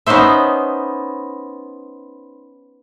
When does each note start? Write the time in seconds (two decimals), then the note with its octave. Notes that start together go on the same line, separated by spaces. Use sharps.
0.07 B3 C#4 D#4 C5 E5